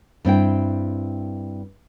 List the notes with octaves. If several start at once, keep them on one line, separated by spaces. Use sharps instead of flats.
G2 C4 E4 G5